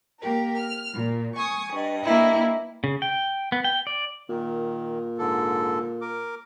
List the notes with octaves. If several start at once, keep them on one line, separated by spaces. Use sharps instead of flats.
A#3 G4 A#4
F6
A#2
G#5 C#6 D#6
G2 D#5
A#3 E4
C#3
G5
B3
G5
D5
A#2 D#3
G#2 D3 A4
A#4 D6